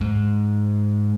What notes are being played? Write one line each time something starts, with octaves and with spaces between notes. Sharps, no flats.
G#2